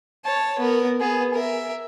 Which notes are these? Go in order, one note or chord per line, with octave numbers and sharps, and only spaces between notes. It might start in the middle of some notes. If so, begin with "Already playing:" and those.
C#5 A5
B3 A#4
B3 G#4
A#4 E5